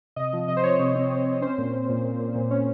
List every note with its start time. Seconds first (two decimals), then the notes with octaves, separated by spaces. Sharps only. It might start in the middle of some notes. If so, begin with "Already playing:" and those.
0.16 C3 D#5
0.33 F3 D#5
0.48 C3 D#5
0.57 C5
0.63 F3 C#5
0.79 C3
0.95 C4
1.10 C4
1.26 C4
1.41 C#4 C5
1.58 A#2
1.73 A#2
1.89 A#2
2.04 A#2
2.20 A#2
2.35 A#2
2.51 C#4